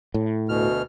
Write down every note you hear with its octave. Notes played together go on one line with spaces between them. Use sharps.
A2
D2 B2 F6